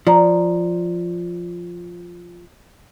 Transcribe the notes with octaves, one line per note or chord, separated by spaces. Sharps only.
F3 D5 A#5